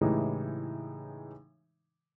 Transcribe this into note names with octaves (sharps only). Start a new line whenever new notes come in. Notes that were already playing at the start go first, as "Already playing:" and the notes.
A2 C#3 E3 G#3 D#4 G4